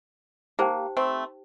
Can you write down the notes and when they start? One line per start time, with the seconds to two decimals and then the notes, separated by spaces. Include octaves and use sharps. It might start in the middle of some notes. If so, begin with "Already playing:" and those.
0.59 A#3 D#4 G4 C5 G5
0.97 A3 C4